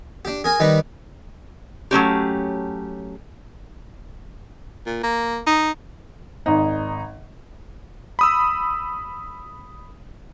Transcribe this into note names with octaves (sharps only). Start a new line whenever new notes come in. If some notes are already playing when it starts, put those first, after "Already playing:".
D4 G4
G#4 A#4 G#5
D#3 G3 D#4 G4 B4
F#3 A3 C#4 G4
A#2
A#3
D#4
G#1 D#4
B5 D#6 E6